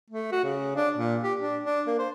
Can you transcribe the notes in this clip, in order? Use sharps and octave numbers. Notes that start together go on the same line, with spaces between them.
A3
F#4
C#3
D4
A#2
G4
D4
D4
A#3
C5